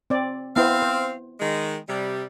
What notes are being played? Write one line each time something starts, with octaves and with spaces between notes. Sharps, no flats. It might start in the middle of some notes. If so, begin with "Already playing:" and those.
C4 D5
B3 C4 E4 C5 F5
C5
D#3 G#3
C3 G3